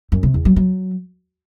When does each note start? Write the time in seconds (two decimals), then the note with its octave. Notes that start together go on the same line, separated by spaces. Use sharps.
0.12 F#2
0.23 C3
0.34 E2
0.45 F#3
0.56 F#3